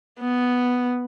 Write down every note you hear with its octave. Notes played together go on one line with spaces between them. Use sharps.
B3